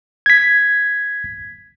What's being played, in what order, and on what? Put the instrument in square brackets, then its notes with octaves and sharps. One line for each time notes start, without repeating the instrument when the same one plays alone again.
[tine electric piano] G#6 B6